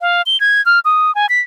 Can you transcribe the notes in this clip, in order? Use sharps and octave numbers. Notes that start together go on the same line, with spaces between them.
F5
G7
G#6
F6
D#6
G#5
B6